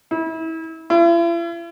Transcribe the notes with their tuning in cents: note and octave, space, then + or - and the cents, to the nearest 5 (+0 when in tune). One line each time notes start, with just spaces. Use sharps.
E4 -30
E4 +45